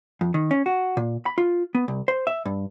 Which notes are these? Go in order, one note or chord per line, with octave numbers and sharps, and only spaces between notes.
F2
D#3
C#4
F#4
A#2
B5
F4
B3
C2
C5
E5
G2